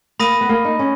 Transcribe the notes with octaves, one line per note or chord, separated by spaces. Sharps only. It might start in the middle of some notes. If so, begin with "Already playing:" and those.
A#3 B5 D#6 A#6 D#7
B3
A#3
D#4
C#4